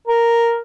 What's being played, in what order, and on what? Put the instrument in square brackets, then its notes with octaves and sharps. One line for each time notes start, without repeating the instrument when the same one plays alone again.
[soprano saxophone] A#4